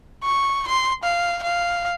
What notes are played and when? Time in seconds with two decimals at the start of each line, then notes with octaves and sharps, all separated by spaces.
0.24 C#6
0.68 C6
1.04 F5
1.43 F5